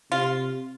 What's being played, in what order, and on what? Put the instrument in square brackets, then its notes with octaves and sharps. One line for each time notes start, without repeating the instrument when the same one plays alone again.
[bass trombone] C3 [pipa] F4